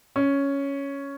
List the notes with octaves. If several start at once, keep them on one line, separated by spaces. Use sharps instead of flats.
C#4